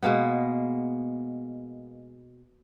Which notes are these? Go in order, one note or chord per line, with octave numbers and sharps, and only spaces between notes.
B2 G#3 A#3 B3